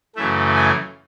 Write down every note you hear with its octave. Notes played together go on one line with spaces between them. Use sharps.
F#2 C#3 E3 A3 E5
G#5